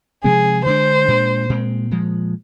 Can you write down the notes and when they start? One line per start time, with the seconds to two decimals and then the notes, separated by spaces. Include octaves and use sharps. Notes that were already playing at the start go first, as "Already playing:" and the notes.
0.24 C3 F3 G#3 C4 G#4
0.65 D3 G#3 D4 C5
1.08 A#2 G#3 D4
1.49 A#2 G#3 C4
1.91 A#2 F3 G#3